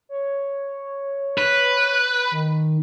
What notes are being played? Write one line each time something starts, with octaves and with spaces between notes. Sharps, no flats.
C#5
B4
D#3